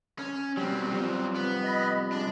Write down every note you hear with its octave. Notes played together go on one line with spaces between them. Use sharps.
C#4
B2 F#3 G3 C4
C3 F3 G3
B3
D#5 B5
G#3 D4